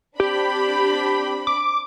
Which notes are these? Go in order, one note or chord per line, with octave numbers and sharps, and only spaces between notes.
C4 D4 G4 B5
D6